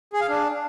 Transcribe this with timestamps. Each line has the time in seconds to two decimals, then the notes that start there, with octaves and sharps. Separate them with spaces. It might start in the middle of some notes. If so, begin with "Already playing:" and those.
0.13 G#4
0.21 F5
0.29 D4